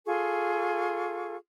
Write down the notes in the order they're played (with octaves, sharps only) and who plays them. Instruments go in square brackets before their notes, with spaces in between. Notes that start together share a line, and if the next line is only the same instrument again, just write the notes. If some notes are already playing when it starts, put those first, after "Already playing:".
[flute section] F4 G#4 A4 C#6